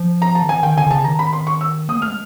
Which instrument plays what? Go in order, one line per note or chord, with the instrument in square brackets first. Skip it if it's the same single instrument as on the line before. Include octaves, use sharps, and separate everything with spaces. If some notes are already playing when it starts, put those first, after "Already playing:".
Already playing: [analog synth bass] F3
[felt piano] A#5
A5
[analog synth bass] D#3
[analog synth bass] E3 [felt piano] G#5
[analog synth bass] D#3 [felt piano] G5
[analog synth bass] D3 [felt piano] G#5
[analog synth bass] D3
[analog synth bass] C#3 [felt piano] A5
[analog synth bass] D#3 [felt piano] A#5
[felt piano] B5
C6
C#6
E6
[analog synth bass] A#3 [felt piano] D#6
[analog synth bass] A3 [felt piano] F6
[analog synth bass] G#3